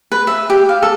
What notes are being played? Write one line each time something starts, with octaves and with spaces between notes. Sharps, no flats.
B4
E5
G4
F5
A4